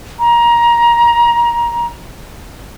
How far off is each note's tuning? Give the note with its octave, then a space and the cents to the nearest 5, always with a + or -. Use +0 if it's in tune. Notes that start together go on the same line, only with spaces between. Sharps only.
A#5 +20